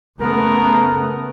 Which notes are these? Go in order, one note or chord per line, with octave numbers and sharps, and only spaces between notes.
C#3 A3 B3 A#4